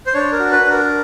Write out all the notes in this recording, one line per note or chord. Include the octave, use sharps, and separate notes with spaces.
C5
D4 C#5
A#4
F#4
B4
D4
A#4